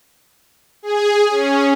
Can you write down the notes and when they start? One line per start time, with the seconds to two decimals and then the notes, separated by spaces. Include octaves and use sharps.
0.83 G#4
1.31 C#4